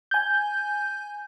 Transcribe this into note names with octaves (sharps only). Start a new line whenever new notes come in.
G#5 G6